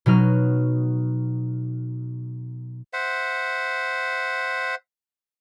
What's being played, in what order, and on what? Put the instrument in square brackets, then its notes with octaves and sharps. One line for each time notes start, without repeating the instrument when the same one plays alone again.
[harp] B2 F#3 D#4 F6
[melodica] C5 E5 F#5